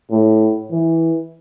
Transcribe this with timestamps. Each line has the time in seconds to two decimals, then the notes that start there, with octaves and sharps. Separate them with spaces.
0.11 A2
0.71 E3